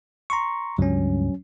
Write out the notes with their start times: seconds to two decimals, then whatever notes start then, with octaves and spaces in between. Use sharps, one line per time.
0.30 A#5 C6 C#6
0.78 C#2 G2 F3 F#3 C#4